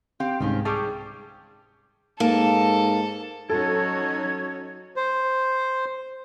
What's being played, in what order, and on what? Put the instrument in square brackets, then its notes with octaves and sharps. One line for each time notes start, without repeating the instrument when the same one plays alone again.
[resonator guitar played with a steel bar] C4 G4 F5
[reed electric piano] C2 G#2 [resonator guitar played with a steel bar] D#3 C4 C#4
[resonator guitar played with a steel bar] G3 G4 G#4 [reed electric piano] A5 C#6 D6
[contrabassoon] G#2 [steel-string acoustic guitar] A#3 [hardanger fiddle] A4 A5
[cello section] F#3 D#4 F#4 [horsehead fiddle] C#4 C#5 [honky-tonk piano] A4 [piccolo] G#6
[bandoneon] C5